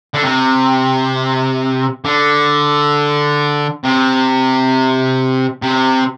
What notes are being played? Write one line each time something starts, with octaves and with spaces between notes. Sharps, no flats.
D3
C3
D3
C3
C3